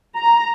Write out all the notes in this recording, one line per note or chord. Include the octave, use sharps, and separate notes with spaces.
A#5